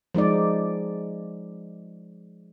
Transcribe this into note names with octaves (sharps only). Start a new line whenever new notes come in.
F3 G#3 D#4 D5